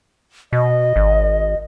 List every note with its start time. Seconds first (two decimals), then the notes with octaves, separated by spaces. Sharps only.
0.53 B2 D#5
0.96 G#1